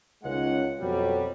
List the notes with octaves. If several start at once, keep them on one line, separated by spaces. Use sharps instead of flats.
C#2 D#3 G#3 F#5
F2 B2 F#3 G3